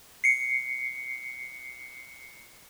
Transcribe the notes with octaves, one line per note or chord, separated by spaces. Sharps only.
C7 C#7